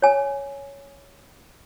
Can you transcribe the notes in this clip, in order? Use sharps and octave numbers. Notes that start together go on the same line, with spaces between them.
C#5 G#5